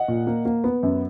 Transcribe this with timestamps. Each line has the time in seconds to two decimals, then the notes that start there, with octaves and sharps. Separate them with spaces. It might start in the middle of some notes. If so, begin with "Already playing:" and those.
Already playing: D#5 F#5
0.08 A#2
0.27 A#3
0.45 A#3
0.64 B3
0.83 F#2